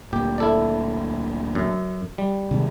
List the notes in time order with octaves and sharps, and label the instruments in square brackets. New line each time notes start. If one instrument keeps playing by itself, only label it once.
[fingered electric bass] D2 A#2 [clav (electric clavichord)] G4
[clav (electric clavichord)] E4 A4 D5
F#2
G3
[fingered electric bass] C3 D#3 G#3